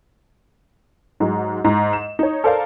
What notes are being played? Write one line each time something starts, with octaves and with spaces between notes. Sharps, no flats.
G#2 F#3 G#3
G#2
E7
D#4 C#5
A4 A#4 C5 D5 F5 A5